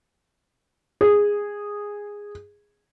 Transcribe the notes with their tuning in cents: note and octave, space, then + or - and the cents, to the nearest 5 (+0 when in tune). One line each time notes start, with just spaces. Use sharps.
G#4 -10